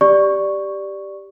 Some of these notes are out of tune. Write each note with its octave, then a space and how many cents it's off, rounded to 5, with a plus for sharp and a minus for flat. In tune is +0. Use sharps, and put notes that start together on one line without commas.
G4 +0 D5 +0 C#6 +0